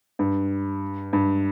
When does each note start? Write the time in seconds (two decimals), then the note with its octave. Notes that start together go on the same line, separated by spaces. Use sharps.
0.19 G2
1.13 G2